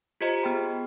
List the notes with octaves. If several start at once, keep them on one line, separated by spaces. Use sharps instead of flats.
F4 G4 C5 D#5 A#5
B3 G#4 G5 B5